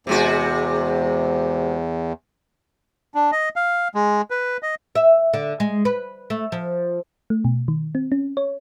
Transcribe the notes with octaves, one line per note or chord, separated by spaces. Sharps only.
E2 C3 G#3 F#4
D4
D#5
F5
G#3
B4
D#5
E5
D3
G#3
B4
A3
F3
A3
B2
D#3
C4
C#4
C#5